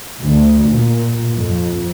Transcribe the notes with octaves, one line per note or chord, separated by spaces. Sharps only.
D2
A#2
F2